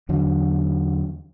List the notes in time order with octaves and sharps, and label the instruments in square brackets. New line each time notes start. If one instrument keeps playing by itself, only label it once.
[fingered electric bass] E2 D3 F#3